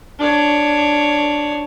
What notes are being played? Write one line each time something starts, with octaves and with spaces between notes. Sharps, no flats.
D4 C#5